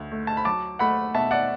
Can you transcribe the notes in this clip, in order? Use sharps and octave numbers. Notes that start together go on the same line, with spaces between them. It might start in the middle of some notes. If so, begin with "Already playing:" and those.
Already playing: D2
A3
A5
B5
F#3 A5 D6
A3 F#5 B5
B2 E5 A5
D5 F#5